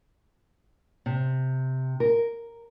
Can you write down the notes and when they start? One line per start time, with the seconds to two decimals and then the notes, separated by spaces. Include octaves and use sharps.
1.06 C3
2.00 A#4